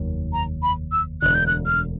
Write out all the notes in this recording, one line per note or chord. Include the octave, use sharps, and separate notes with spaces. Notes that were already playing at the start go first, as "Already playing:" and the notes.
Already playing: F1 D#2 D#3 F#3
A#5
B5
E6
E1 D2 D3 F#6
G6
F#6
F6